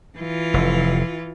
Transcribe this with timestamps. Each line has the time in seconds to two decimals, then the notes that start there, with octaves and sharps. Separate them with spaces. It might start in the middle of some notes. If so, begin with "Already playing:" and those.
0.19 E3 F4
0.54 F1